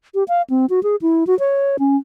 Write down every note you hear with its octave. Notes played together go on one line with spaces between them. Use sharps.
G4
F5
C4
F#4
G#4
E4
F#4
C#5
C#4